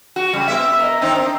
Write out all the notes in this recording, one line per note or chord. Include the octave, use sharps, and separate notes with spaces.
F#4
C#3 G3
B3 E5
A#4 D#5
D#3 C4 D#4
D4